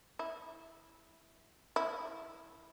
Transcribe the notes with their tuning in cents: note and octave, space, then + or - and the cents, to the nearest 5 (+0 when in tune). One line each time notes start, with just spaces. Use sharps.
E4 -5
E4 -5